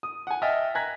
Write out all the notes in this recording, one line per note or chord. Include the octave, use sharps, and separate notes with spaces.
D#6
F#5 G#5
D#5 E5 G5 G#5 F6 A6
G#5 A#5 F#6 G#6 A#6 B6